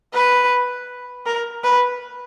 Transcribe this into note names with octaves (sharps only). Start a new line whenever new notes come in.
B4
A#4
B4